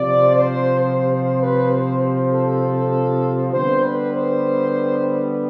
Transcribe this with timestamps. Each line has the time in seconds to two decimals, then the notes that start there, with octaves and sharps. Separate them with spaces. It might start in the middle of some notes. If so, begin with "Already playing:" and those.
Already playing: C3 F3 C4 D5
0.36 C5
0.81 C5
1.11 C5
1.41 B4
1.71 C5
2.01 C5
2.31 A4
3.51 D3 G3 B3 C5
3.81 B4
4.12 C5